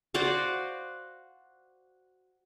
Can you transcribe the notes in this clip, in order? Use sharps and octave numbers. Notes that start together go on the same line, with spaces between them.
F#4 C5 D5 F5